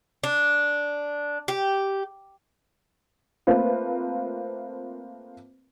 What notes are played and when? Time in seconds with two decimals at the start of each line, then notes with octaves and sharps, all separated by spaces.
0.23 D4
1.48 G4
3.47 A3 A#3 C4 F4 B4